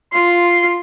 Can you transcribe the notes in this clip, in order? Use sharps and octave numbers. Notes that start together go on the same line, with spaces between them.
F4 C6